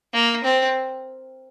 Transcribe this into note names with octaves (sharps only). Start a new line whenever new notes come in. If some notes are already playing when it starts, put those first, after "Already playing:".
A#3
C4